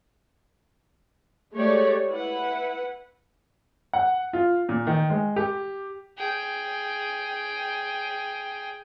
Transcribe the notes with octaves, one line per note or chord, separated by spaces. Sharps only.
G#3 A3 G4 C#5 D5
E4 B4 F#5
F#5
F4
A#2
D#3
G#3
G4
G#4 G5